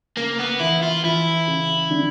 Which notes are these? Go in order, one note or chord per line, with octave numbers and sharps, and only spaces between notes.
C#3 A#3
B3
E3 E4
F4
E3 E4
C#3
D3